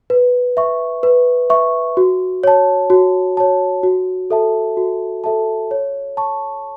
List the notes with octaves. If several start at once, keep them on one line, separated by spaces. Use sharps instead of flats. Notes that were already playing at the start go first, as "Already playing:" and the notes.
B4
E5 C#6
B4
E5 C#6
F#4
C#5 A5
F#4
C#5 A5
F#4
A4 E5 A5
F#4
A4 E5 A5
C#5
A5 C#6